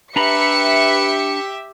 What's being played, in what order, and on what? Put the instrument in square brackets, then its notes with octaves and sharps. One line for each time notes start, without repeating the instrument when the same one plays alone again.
[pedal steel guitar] D4 A#5 B5 [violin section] G4 E5 [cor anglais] B4 [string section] C#7